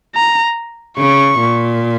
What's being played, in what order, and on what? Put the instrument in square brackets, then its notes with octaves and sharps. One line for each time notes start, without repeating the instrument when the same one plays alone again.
[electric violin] A#5
[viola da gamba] C#3 [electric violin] C#6
[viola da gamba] A#2